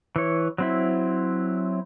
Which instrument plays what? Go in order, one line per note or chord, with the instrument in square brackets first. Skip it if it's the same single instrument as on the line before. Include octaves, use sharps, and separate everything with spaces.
[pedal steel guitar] E3 C#5
F#3 C4 E4